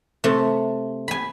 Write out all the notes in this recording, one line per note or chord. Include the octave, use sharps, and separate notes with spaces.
C3 A3
G#5 B5